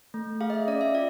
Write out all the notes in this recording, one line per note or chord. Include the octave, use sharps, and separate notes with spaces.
A3
G#4 F5
D#5
E5
C#4 D5
E5
F4 D5